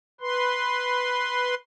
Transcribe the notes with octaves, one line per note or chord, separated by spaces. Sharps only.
B4 C6